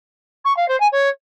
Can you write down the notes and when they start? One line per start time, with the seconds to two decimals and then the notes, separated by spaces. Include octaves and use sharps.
0.45 C#6
0.57 F5
0.68 C5
0.80 G#5
0.92 C#5